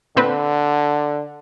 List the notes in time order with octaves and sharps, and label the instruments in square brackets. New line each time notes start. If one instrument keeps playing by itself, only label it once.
[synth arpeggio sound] A#2 C4 B4 [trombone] D3